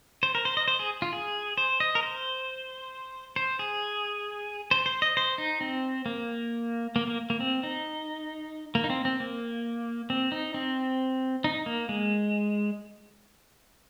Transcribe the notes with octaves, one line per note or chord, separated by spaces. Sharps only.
C5
A#4
C5
D#5
C5
G#4
F4
G#4
C5
D#5
A#4
C5
C5
G#4
C5
C5
D#5
C5
D#4
C4
A#3
A#3
A#3
A#3
C4
D#4
A#3
D#4
C4
C4
A#3
C4
D#4
C4
D#4
A#3
G#3